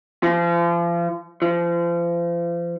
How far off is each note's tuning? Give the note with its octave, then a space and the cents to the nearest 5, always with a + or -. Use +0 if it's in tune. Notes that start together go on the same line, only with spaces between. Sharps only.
F3 -35
F3 -35